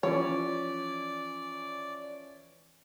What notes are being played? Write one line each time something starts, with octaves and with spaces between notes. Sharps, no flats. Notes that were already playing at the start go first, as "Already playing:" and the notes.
E3 F3 C#4 C#5 D5